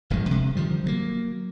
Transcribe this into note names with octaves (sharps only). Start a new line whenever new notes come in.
D1 G2 F3 G#3
G2 C3
D3 D#3 F3 G3
F#3 G#3 A#3